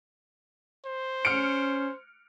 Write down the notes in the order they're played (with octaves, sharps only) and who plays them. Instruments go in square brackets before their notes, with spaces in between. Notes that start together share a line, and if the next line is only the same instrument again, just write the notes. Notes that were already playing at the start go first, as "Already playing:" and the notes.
[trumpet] C5
[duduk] C#4 [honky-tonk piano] F6 C#7 D7